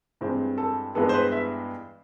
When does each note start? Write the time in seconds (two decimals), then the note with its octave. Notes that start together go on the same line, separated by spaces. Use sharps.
0.21 G2 E3 G#3 C4
0.58 A4
0.95 G2 E3 G#3 B3 A4
1.09 C5
1.14 B4
1.32 E5